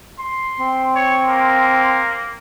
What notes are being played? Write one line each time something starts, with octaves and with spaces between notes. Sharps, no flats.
C6
C4
C#5
A#3